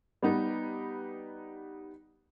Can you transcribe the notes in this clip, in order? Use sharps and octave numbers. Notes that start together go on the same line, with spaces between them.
G3 B3 D#4 B4